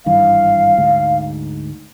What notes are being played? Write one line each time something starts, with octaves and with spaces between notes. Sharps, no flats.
G#1 G2 E3 F5
D2 G#2